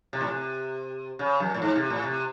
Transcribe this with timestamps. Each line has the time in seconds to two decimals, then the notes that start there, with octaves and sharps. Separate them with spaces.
0.13 C3
0.21 A2
0.29 C3
1.19 C#3
1.40 F#2
1.54 A2
1.62 G#2
1.76 C3
1.90 A2
2.04 C3